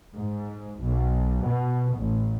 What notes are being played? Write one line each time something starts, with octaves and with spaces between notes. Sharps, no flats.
G#2
B1
B2
A1